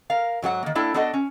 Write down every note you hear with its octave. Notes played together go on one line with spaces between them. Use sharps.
A#4 F5
G#2 F#3 G4 F#5
D#3 A#3
A#3 D4 E4 A4 G5
B3 D4 F#4 A4 D#5 F#5
C#4